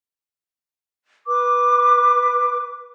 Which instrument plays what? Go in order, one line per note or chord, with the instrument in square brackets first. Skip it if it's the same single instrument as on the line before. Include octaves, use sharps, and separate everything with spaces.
[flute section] B4 D6